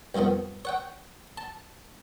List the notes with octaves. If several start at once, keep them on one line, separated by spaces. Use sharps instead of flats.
C2 F2 D#3 F3 B3
C#5 F#5 G5
A5